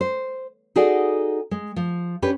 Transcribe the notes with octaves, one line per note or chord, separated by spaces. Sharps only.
C5
D#4 F#4 G#4 A4 D5
G#3
F3
C#4 D4 G4 B4